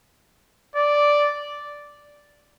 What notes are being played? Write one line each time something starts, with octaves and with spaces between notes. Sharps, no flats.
D5